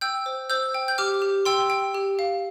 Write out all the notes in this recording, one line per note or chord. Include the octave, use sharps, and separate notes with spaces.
G5 E6 G6
C5
C5 E6 G6
G5
G6
G4 D6 F6
G4
G5 C6 E6
G5
G4
F5